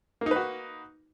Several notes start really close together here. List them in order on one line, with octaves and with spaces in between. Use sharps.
A#3 D#4 B4 F#4